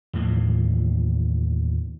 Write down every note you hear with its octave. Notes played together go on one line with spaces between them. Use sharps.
D#2 A2 E3 F3